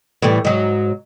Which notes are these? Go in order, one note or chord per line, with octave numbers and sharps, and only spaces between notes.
A2 E3 G3
G#2 F#3